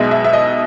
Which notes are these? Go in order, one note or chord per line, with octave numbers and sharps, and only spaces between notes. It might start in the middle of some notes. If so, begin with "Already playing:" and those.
Already playing: B1 B2 G#3 E5
E5
E5
D#5